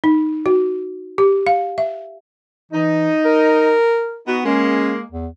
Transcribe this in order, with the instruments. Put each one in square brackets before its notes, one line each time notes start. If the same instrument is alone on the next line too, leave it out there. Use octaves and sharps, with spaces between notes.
[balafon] D#4
F#4
G4
F5
E5
[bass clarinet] E3 [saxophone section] D#4
[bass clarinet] A#4
[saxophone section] B3 D#4 F#4
[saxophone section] G#3 A#3 [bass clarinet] C#4
[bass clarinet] E2